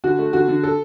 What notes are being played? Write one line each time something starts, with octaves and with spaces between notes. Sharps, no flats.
D3 F#4
A3
D3 F#4
D3
A4